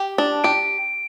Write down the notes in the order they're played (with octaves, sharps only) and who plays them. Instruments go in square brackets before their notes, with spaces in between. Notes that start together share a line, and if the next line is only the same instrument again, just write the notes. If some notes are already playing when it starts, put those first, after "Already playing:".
Already playing: [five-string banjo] G4
D4
[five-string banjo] G4 [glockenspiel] D7